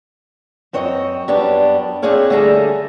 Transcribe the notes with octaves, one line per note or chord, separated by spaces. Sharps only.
F#2 C4 C#5 D#5
F#2 G3 B3 D4 C#5 A5
C4 D4 E4 G#4 C#5 F5
D3 G3 A3 G#4 A4 A#5